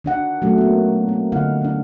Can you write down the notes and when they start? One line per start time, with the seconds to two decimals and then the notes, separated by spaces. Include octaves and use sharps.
0.04 D#3 D4 F#5
0.42 F#3 A3 C#4
0.58 A#3 B3
1.09 C4
1.32 D3 D#4 F5 F#5
1.62 C#4 D4